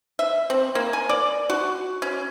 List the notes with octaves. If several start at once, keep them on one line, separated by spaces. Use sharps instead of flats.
E5
C4
A#3
G#5
D5
F#4
C#4